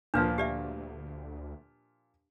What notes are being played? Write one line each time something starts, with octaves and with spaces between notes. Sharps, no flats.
D2 A#2 F3 D4 B4 F5
G4 D5 E5